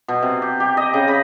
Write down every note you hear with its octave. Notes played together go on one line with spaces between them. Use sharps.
B2
C3
G4
G4
D#5
C#3
B5